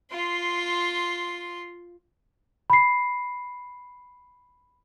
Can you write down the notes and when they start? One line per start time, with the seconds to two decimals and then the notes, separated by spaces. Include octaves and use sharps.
0.11 F4 C6
2.70 B5 C7